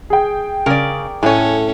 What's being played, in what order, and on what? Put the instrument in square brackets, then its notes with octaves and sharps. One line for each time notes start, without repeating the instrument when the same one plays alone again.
[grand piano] G#4 G5
[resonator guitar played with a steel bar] C#3 [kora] A#4 D5
[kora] A2 [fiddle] C#4 A4 [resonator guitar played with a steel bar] C#5 G#5